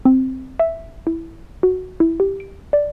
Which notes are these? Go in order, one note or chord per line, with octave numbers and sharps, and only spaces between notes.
C4
E5
E4
F#4
E4
G4
D7
D5